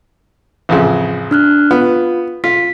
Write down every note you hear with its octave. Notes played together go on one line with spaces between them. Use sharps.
A1 F2 C#3
D4 F6 F#6
B3 F4
F4 B6